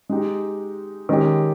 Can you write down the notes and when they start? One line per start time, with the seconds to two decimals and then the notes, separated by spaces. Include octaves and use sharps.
0.09 G#3 D#4 G4
1.09 D#3 G#3 C#4 G4